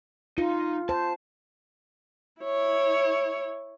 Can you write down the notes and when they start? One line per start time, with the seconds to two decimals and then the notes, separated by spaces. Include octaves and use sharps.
0.38 D#4 F4
0.89 C5 A5
2.42 E4 C#5